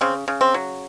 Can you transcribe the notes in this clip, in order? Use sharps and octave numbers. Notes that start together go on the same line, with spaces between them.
C#3 C4
C#3
C4
F#3